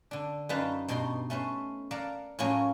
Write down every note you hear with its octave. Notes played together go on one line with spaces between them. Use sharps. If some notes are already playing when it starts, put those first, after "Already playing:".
D3 D4
F#2 D4 D#4 B4 F5 A5
G2 B2 D#4 C6
A3 C#4 B4 C5
A#4 D5 F5 F#5 A5
A2 F3 F#3 A#3 C#4